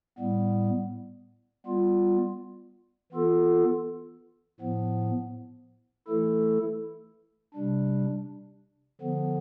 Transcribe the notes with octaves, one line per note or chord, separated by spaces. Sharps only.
A2 G3 B3
G3 B3 F4
E3 B3 F4 A4
A2 F3 B3
E3 A3 E4 A4
C3 G3 D4
D3 F3 B3